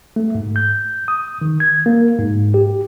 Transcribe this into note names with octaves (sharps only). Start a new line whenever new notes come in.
A3
G#2
G6
D#6
D#3
G#6
A#3
G#2
G4